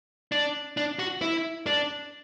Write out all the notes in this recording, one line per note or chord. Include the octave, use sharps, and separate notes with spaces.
D4
D4
F#4
E4
D4